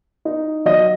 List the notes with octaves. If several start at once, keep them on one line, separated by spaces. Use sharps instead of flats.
D#4
F#3 D#5